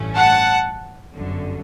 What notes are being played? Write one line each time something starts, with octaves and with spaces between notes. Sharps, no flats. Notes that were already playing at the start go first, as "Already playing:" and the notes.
Already playing: A1 G2 E3 A3 C#4
F#5 A5
G1 F#2 D3